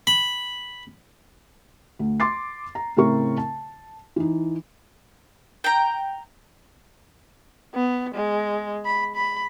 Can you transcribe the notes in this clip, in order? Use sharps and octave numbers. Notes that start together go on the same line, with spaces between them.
B5
D2
C6 D6 A6 C7
A#5
A2 C#3 C4 E4 A#4 C#6
A5
E3 D#4
G5 A#5
B3
G#3
B5
B5